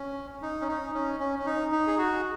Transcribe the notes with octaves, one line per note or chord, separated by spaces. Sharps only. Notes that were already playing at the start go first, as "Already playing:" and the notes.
Already playing: C#4
D#4
C#4
D#4
C#4
C#4
C#4
D#4
D#4
G#4
F#4